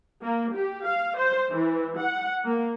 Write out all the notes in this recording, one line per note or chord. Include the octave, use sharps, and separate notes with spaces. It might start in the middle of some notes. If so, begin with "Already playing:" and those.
A#3
G4
F5
C5
E3
F#5
A#3